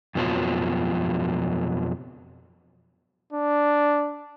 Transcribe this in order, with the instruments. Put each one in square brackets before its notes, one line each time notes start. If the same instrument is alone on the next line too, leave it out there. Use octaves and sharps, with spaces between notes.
[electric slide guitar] F2 B2 D3 F3 F#3
[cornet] D4